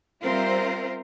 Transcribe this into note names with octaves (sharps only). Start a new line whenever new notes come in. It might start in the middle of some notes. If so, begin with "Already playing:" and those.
G3 C4 F4 A#4 C5 E5